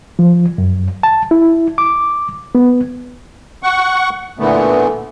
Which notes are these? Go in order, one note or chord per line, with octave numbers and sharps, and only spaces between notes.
F3
F#2
A5
E4
D6
B3
F#5 C#6
A#2 D3 E3 A3 B3